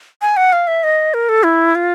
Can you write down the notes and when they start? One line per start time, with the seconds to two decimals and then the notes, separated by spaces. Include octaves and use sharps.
0.22 G#5
0.37 F#5
0.53 F5
0.67 E5
0.84 D#5
1.14 A#4
1.29 A4
1.43 E4
1.75 F4